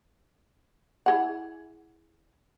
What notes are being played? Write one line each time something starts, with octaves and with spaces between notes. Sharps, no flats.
E4 G#4 F#5